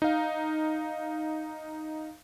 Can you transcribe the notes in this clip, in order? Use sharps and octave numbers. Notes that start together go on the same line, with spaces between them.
D#4 F5